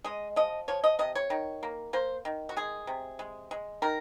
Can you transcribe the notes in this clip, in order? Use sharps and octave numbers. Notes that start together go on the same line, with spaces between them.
G#3 D#5
F3 D#5
F3 C#5
D#5
C3 D#5
C#5
D#3
A#3
A#3 C5
D#3
F#4
G#3 G#4
C3
G#3
G#3
D#3 A#4